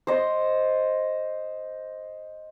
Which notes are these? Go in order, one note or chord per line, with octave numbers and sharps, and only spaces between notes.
C5 D#5